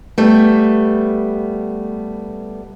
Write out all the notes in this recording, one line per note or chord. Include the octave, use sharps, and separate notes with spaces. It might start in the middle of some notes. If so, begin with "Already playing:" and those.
G3 A3 B3